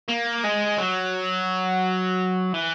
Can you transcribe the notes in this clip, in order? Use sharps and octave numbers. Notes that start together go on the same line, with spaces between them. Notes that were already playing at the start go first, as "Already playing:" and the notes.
A#3
G#3
F#3
E3